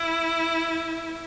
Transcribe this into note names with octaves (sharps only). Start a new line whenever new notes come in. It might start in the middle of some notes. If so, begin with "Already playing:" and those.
Already playing: E4